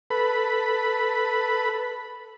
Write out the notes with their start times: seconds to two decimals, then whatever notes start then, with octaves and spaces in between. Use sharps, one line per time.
0.10 A4 B4 B5